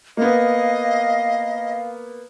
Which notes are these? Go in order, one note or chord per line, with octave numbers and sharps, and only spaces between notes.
A#3 B3 D#5 F5